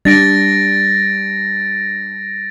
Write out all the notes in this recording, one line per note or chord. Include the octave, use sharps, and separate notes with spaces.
G3 D4 A6 A#6 D7